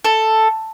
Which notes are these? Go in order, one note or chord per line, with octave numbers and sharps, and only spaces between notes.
A4